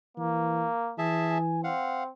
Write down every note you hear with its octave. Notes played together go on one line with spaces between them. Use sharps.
E3 A#3
E3 G#4 E5 A5
G#5
C4 F5 F#5